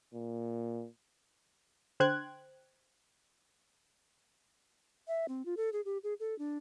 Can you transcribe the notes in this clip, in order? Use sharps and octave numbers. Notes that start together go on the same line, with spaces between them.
A#2
D3 C5 G5 F#6 G#6
E5
C4
F4
A4
G#4
G4
G#4
A4
D4